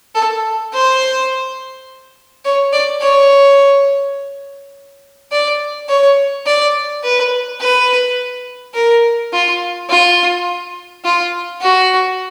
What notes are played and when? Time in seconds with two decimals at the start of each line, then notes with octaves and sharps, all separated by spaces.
0.15 A4
0.74 C5
2.45 C#5
2.73 D5
3.02 C#5
5.32 D5
5.89 C#5
6.46 D5
7.04 B4
7.60 B4
8.74 A#4
9.33 F4
9.90 F4
11.05 F4
11.61 F#4